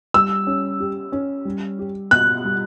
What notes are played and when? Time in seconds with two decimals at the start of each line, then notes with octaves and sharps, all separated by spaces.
0.14 G3 E6
0.47 C#4
0.80 G4
1.12 C#4
1.45 G3
1.79 G4
2.11 B2 F#6
2.45 G3